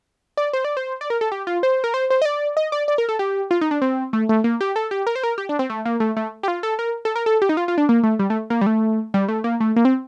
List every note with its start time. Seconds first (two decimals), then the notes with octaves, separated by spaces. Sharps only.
0.37 D5
0.53 C5
0.65 D5
0.77 C5
1.01 D5
1.10 A#4
1.21 A4
1.32 G4
1.47 F4
1.63 C5
1.84 A#4
1.94 C5
2.10 C5
2.22 D#5
2.25 D5
2.57 D#5
2.72 D5
2.88 D5
2.98 A#4
3.09 A4
3.19 G4
3.51 F4
3.61 D#4
3.71 D4
3.82 C4
4.13 A3
4.29 A3
4.44 A#3
4.61 G4
4.76 A4
4.91 G4
5.07 A#4
5.16 C5
5.23 A#4
5.38 G4
5.49 D4
5.59 C4
5.70 A3
5.85 A#3
6.00 A3
6.17 A3
6.43 G4
6.48 F4
6.63 A4
6.79 A#4
7.05 A4
7.16 A#4
7.26 A4
7.42 G4
7.49 D#4
7.57 F4
7.68 F4
7.78 D4
7.89 A#3
8.03 A3
8.19 G3
8.30 A3
8.50 A#3
8.61 G3
8.67 A3
9.14 G3
9.28 A3
9.44 A#3
9.60 A3
9.76 A#3
9.85 C4